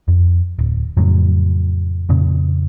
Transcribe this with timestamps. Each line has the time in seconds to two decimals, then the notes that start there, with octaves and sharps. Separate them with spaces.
0.08 F2
0.59 D1
0.97 F2 A2 C#3 F#3
2.09 F2 A#2 C#3